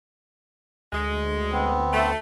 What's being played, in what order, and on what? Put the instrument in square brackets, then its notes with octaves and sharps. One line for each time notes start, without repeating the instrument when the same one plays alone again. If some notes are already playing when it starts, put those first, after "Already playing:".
[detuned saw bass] D2 [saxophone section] G#3
[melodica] B3 C4
[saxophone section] A3